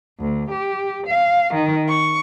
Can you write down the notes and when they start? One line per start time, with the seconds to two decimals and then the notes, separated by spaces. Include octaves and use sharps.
0.21 D2
0.51 G4
1.07 F5
1.54 D#3
1.87 C#6